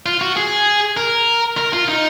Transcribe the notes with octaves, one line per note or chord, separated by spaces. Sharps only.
F4
F#4
G#4
A#4
A#4
F4
D#4